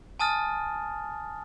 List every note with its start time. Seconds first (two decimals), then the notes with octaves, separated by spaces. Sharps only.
0.19 G#5 A5 D#6 F6 A6